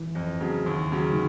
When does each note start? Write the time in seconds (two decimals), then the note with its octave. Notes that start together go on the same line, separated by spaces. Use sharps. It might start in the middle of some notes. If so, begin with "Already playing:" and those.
Already playing: E3
0.15 F2
0.41 C#3 F#3
0.66 D#2
0.92 C#3 F#3
1.13 D#3